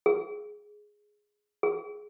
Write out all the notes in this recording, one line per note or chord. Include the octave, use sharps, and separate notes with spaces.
G#4
G#4